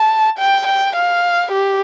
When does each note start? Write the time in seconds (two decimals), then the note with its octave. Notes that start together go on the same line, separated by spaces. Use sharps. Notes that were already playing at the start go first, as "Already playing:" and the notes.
Already playing: A5
0.38 G5
0.67 G5
0.96 F5
1.52 G4